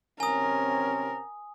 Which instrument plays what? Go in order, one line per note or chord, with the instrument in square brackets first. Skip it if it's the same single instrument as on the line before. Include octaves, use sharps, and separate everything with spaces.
[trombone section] C3 C4 C#4 [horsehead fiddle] A#4 [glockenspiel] G#5 D#6